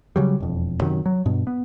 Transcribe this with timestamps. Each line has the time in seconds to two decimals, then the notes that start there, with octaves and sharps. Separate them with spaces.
0.16 C#3 F#3 G3
0.40 E1 F2
0.81 F#2 C3 D#3 F#3
1.06 F#3
1.26 G2 B2
1.47 B3